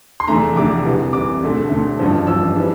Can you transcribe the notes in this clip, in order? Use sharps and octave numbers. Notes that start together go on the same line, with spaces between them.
C6
F1 E2 D3 A3 D4 A#5
F1 E2 D3 A3 D4 D6
C2 C3 E3
C2 C3 E3 D6
E1 D2 D3 A3
E1 D2 D3 A3
A1 G2 F3
A1 G2 F3 E6
E3 G3 D4